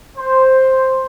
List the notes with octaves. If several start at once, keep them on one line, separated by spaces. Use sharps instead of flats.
C5